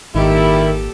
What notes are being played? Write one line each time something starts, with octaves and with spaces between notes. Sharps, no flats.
G#1 A#2 D#3 G3 E4 G4 A4